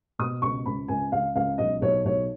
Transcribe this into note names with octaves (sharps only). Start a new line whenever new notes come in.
B2 D#6
C#2 C#6
C#2 B5
C#2 G#5
C#2 F5
C#2 F5
B1 D#5
B1 C#5
B1 C#5